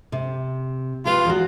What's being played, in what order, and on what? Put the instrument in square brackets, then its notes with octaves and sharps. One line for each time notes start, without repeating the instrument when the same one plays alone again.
[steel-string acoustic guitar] C3
[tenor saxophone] F4 [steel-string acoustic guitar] G4 B4
[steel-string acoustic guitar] E2 F#4